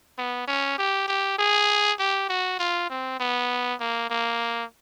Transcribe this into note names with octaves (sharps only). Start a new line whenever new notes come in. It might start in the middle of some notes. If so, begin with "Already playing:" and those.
B3
C#4
G4
G4
G#4
G4
F#4
F4
C4
B3
A#3
A#3